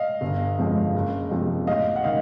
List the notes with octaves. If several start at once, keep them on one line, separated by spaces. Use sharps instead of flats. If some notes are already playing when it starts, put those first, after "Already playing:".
Already playing: D#5 F5
G1
F2 C#3 F3 G#3
F#1
E2 C3 F3
A1 D#5 F5
F#5
D#3 D#5 F5